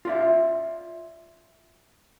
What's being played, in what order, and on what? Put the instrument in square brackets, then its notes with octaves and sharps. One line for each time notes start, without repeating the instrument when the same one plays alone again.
[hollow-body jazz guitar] F4 D5 E5